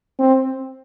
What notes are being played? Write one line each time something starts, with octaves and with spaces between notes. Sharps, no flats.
C4